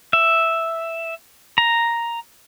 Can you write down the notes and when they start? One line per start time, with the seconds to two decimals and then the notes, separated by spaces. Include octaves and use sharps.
0.13 E5
1.58 A#5